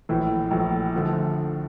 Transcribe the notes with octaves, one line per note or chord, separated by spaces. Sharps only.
A#1 A2 E3
A#1 A2 E3
D3 F3 A3